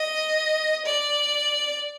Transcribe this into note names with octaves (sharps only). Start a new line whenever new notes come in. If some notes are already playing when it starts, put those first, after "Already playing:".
Already playing: D#5
D5